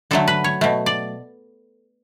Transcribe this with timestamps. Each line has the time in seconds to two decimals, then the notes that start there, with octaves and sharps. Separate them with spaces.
0.11 D3 F#3 A3 A4
0.28 B4
0.44 C#5
0.61 B2 A3
0.86 D5